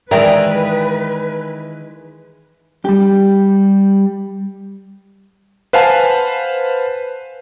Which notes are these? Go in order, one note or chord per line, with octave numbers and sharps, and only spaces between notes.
D#3 E3 G#3 A#4 B4 D5 E5 G5
G3 G4
B4 C5 F5 F#5 G#5 A5